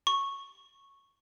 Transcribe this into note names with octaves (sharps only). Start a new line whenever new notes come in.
C#6